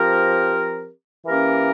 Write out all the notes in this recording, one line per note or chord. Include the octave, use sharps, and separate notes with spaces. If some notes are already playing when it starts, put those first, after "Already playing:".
Already playing: F3 C4 G4 A#4
E3 A#3 C#4 G4 A#4